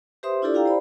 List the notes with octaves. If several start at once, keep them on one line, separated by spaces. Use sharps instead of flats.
G4 B4 C5 E5 C6 D#6
D4 E4 F4 G4 A4 D5
E4 G4 F5 G5 A#5
C5 D5 B5